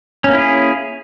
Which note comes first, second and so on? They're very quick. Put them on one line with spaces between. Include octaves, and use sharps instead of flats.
C#4 A#3 E4 G#4